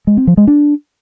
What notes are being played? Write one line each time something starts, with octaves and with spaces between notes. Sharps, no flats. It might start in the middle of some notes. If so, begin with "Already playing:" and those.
G#3
C4
F3
G#3
D4